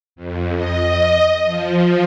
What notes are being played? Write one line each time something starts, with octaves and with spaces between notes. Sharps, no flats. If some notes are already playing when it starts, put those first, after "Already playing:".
F2
D#5
F3